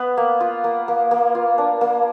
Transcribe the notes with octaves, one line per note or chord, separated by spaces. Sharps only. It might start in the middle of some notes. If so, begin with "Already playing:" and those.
Already playing: B3 B4
A#3
F4
A#3
A#3
A#3
F4
D4
A#3